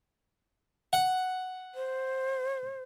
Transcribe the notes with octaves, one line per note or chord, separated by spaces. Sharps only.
F#5
C5